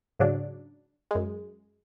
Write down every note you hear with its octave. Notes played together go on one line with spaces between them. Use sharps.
G#2 C#3 F#3 D4
F#2 G#3